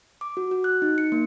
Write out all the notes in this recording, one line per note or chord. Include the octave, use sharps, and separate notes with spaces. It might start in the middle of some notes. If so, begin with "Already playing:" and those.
D6
F#4
F#4
F#6
D#4
C#7
A#3